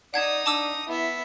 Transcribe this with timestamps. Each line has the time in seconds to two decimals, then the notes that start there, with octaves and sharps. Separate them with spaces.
0.14 D#4 D5 F#5 D#6 G#6 E7
0.46 D4 A5 D6 E6
0.89 B3 E4 E5